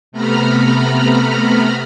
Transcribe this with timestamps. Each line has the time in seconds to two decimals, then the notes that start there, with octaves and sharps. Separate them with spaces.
0.12 C3 A3 B3 A#5 B5 F6